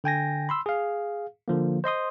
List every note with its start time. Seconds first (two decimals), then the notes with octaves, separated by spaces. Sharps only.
0.04 D3 G5 G#5 A#6
0.49 B5 C6 E6
0.66 G#4 F5
1.48 D3 F3 A#3
1.84 C5 D#5 C6 D#6